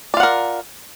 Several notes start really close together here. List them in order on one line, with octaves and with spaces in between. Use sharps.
D5 F4 F#5 A#4